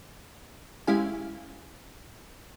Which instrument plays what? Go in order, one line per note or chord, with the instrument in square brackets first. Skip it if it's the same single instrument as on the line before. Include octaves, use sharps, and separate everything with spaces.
[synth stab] G#3 C#4 E4 G4 F5 G#5